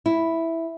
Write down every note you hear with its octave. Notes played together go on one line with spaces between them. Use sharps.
E4